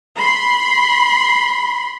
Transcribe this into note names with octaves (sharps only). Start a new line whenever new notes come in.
B5 C6